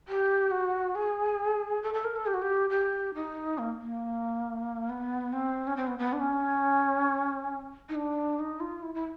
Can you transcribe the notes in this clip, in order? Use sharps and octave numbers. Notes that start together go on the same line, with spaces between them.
G4
F#4
G#4
A4
A4
A#4
A4
G4
F#4
G4
G4
D#4
A#3
A#3
B3
C4
C#4
C4
B3
B3
D4
C#4
D#4
D4
D#4
F4
E4
E4